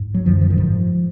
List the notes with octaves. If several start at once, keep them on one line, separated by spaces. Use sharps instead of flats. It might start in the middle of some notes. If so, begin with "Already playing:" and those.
Already playing: G#2
F#3
F#2 D3 F3
F3
D#3
G#2 F3